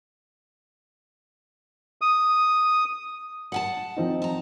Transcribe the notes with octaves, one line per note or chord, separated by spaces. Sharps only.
D#6
F#5 G#5 A5
F3 C4 D#4
A5 A#5